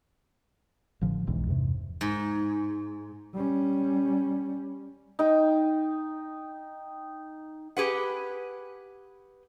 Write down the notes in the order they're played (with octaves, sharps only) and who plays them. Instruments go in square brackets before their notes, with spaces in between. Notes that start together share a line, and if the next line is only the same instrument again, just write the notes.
[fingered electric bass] A1 D3 F3
E1 B1 G#2 E3
E2 G2 C3
[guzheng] G#2
[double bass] G3 C#4
[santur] D#4 G5
[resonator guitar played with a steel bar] G4 G#4 B4 F#5